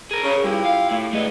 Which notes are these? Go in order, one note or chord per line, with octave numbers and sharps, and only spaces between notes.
G#4 A#4
C#3
G2 E4 F4 G4
F5
A2
D3 G#3 A3 B4